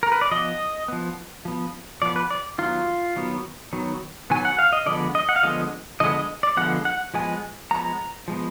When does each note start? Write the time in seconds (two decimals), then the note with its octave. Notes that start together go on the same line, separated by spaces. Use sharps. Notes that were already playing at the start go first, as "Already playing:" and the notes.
0.03 A#4
0.12 B4
0.21 D5
0.31 F3 B3 D#5
0.88 F3 B3
1.45 F3 B3
2.02 F3 B3 D5
2.16 B4
2.31 D5
2.58 D#3 F#3 B3 F4
3.16 D#3 F#3 B3
3.73 D#3 F#3 B3
4.30 D#3 F#3 B3 G#5
4.45 F#5
4.59 F5
4.73 D#5
4.86 D3 F3 G#3 B3 D5
5.15 D#5
5.29 F#5
5.36 F5
5.43 D3 F3 G#3 B3 D#5
6.00 D3 F3 G#3 B3 D#5
6.15 D#5
6.43 D5
6.57 D3 F3 G#3 B3 F#5
6.85 F#5
7.14 F3 G#3 B3 G#5
7.71 F3 G#3 B3 A#5
8.28 F3 G#3 B3